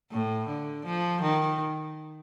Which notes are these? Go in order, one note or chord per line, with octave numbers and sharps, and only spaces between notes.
A2
D3
F3
D#3